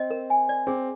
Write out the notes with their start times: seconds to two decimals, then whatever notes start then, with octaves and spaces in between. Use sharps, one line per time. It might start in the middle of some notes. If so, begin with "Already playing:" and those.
Already playing: C4 D#5
0.10 A#4
0.30 G#5
0.49 D5
0.67 C4 G#4